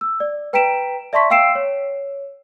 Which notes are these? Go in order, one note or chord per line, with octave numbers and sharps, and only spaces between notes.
E6
D5
B4 G5 A#5 B6 D7 E7
D5 E5 A5 C6 C#6 B6
F5 G5 E6 C7 D7 E7
C#5